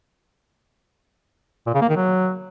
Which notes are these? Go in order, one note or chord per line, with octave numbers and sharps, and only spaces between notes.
A#2
C#3
A#3
D#3
F#3